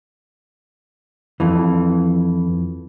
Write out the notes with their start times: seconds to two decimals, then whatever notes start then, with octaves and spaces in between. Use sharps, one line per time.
1.40 F2 E3